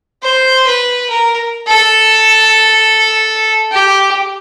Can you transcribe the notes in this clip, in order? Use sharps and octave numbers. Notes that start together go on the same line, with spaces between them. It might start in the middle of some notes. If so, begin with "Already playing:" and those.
C5
B4
A#4
A4
G4